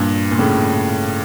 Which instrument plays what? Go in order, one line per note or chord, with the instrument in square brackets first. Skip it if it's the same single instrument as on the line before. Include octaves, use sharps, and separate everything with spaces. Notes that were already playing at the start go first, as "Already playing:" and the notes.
Already playing: [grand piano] G2 A#2
A#2
A2 C#3